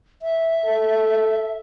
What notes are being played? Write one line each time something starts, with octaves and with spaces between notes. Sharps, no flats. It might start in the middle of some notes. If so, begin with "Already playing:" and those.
E5
A4